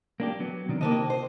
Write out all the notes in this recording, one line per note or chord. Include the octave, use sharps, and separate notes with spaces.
A#3 D4 G4
F#3 B3
C3 D#3 D4
C3 D#3 A#3 D#5 A5
C5